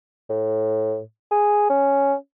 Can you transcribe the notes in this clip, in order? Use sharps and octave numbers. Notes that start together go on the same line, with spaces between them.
A2
G#4
C#4